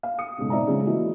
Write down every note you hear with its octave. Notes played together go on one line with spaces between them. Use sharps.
F5
D#6 C#7
B1 G#2 C#3
C4 D#4 D5 E5 A#5
C#3 F3 G#3
E3 A#3 E4 F#4 D#5